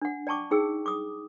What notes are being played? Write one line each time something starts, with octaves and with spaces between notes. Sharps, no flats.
D4 F#5
D5 G5 A5 C#6 D6
D#4 G#4 G5 E6
D6 D#6